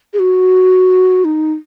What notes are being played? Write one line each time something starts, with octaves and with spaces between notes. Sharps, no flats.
G#4
F#4
D#4